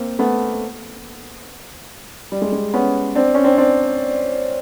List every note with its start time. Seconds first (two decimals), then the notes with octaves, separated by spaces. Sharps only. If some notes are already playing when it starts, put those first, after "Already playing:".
Already playing: A#3 C4
0.19 A3 B3
2.32 G3
2.42 G#3
2.52 G#3
2.74 B3 C#4
3.15 C4 D4
3.35 C#4
3.44 C4 D4
3.58 C4 D4